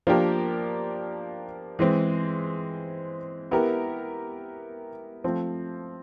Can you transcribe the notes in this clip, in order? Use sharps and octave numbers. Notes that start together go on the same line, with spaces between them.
F3 A#3 D4 G4 A#4
E3 G#3 C4
B3 E4 G4 A#4
F3 A3 C4